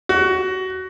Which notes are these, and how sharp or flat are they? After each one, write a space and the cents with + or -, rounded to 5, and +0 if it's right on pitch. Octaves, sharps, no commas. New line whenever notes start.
F#4 +20